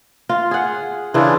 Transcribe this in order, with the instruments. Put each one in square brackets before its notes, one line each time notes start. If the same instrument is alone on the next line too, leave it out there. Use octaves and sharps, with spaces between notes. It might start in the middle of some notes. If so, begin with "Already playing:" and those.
[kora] F4
G#4 F#5
[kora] C#3 E3 [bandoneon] D4 E4 F4